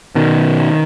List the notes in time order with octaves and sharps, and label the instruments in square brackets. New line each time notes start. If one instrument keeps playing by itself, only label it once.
[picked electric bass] B2 D#3